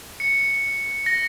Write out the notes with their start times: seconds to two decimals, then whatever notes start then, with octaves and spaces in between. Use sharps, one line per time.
0.20 C#7
1.06 A#6